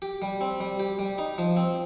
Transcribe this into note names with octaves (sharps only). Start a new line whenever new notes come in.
G4
G3
C4
G3
G4
G3
D#4
F3
C4